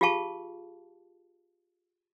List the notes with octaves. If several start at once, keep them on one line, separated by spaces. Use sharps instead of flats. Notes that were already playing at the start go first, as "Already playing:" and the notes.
F4 G4 G#4 F5 A5 C#6